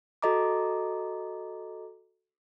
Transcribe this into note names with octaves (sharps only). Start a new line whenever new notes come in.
F#4 A4 D#5 A#5 D6